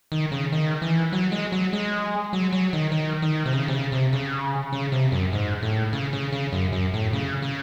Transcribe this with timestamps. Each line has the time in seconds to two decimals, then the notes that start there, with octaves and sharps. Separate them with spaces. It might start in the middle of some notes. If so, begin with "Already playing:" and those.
0.12 D#3
0.32 C#3
0.52 D#3
0.82 E3
1.13 F#3
1.32 G#3
1.52 F#3
1.73 G#3
2.33 F#3
2.53 F#3
2.73 D#3
2.92 D#3
3.22 D#3
3.46 C3
3.53 C#3
3.68 C3
3.73 C#3
3.92 C3
4.13 C#3
4.73 C#3
4.92 C3
5.12 F#2
5.33 G#2
5.63 A2
5.93 C#3
6.13 C#3
6.33 C#3
6.53 F#2
6.72 F#2
6.93 A2
7.13 C#3
7.42 C#3